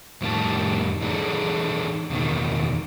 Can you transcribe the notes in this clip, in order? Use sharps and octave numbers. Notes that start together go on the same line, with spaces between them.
F2 A2 D#3 G3 A5
E3 D4 D#4 F#4 G#4 A4
E2 B2 D3 D#3